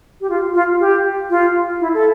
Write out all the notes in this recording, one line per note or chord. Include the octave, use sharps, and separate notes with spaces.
G4
F4
F4
G4
F4
E4
A4